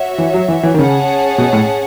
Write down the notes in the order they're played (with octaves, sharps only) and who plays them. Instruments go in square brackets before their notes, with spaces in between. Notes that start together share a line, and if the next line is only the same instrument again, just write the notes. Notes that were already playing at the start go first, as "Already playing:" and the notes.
Already playing: [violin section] F#4 C#5 E5
[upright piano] E3
F#3
E3
E3
D#3
[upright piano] C#3 [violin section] C#4 G#4 C#5 F#5 A5
[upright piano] B2
A2